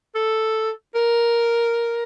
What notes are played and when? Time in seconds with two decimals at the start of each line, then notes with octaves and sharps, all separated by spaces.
0.15 A4
0.95 A#4